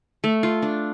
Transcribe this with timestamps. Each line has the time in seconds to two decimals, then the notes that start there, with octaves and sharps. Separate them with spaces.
0.24 A3
0.43 F4
0.62 D4